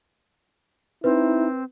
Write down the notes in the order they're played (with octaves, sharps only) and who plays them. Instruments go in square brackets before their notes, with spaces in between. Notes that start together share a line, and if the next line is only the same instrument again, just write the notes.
[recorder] C4 [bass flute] D#4 [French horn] E4 [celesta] B4